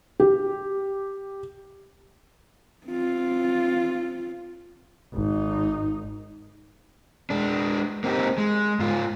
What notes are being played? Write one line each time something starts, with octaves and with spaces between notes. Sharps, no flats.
G4
C4 F4
G#1 D#4
G#3 D4
A#3 C4 D#4 F#4 G4
G#3
G#2 F4